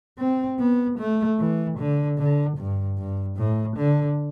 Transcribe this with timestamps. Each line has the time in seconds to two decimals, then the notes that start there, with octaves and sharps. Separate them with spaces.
0.19 C4
0.59 B3
0.99 A3
1.39 E3
1.78 D3
2.18 D3
2.58 G2
2.98 G2
3.37 A2
3.77 D3